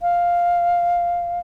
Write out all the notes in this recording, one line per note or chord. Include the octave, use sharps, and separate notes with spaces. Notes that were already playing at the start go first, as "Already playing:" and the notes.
F5